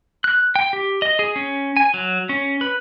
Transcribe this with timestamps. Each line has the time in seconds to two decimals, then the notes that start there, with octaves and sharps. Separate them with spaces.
0.24 F#6
0.56 G5
0.73 G4
1.02 D#5
1.19 G#4
1.36 C#4
1.77 G#5
1.94 F#3
2.29 C#4
2.61 B4